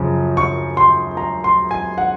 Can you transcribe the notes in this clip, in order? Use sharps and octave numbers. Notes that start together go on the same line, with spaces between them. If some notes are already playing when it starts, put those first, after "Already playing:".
Already playing: F#2 C#3 F3
C#6
C6
A#5
C6
G#5
F#5